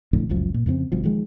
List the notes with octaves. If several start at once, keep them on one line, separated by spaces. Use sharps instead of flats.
A#1 F2 A2 D3
G1 C#2 F#2 F3
A#2
F2 C#3 B3 C4
G1 G2 B2 F3
D#3 F3 G#3